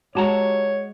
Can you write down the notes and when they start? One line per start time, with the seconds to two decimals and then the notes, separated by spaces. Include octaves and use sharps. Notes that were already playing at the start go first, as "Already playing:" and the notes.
0.15 G#3 F#4 G4 C#5 A5 A#5